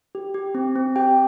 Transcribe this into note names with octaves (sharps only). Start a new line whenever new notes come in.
G4
G4
C4
C4
G4 G5